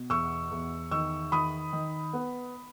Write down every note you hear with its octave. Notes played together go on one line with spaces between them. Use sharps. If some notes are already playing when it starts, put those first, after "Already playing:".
Already playing: B2
E2 C#6 E6
E2
D#3 C#6 E6
D#3 B5 D#6
D#3
B3